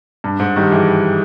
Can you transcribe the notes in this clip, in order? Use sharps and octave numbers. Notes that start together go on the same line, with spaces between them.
G2
G#2
D#3 G3
E3 G#3